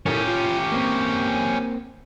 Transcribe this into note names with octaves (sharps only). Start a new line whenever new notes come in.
C#4 E4 G4 A4 A#4
F4
A#3 C4